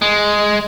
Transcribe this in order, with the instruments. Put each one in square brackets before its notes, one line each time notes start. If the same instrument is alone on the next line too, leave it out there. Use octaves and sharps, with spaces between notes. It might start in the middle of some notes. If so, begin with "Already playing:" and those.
[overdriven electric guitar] G#3